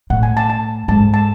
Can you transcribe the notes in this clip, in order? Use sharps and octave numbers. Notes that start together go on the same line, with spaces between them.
A2 F#5
G#5
A5
A5
G#2 A5
A5